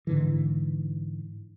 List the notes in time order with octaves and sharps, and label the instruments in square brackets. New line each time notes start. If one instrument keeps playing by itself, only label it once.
[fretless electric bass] G#2 D3 E3